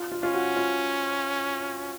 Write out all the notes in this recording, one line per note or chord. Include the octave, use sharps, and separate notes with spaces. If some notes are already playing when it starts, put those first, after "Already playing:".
Already playing: F4
F4
C#4 F4
F#4
F4